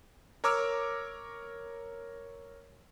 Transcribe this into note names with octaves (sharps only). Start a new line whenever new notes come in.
A#4 C#5 A#5 D6 E6 F6